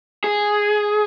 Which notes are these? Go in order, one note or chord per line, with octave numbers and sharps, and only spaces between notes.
G#4